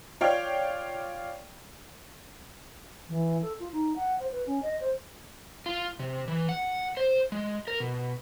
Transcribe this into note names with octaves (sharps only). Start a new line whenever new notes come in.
F4 C#5 D5 F5 G5
E3
A4
F4
D#4
F#5
C5
B4
C#4
D#5
C5
F4
C3
E3
F#5
C5
G#3
A#4
B2